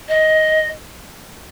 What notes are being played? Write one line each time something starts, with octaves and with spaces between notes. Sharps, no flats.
D#5